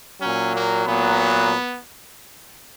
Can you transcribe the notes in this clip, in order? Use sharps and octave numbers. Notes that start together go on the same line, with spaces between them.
A#2 F#3 C#4
A#3
A#2 F#3 B3